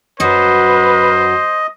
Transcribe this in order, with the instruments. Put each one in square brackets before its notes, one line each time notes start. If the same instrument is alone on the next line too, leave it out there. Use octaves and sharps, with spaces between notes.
[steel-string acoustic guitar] F#2 F#3 [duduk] B4 [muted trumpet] C5 [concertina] D#5